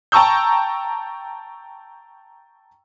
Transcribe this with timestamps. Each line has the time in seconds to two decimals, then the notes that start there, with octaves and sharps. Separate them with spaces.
0.12 G5 A5 A#5 C#6 E6 G6